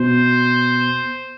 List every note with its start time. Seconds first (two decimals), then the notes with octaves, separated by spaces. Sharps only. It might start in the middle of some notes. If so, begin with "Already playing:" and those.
Already playing: B2 C5